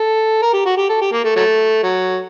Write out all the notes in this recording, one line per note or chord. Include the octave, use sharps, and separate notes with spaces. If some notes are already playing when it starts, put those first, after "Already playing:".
Already playing: A4
A#4
G4
F#4
G4
A4
G4
A#3
A3
F#3 A3
F#3